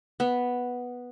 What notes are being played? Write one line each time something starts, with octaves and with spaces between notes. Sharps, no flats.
B3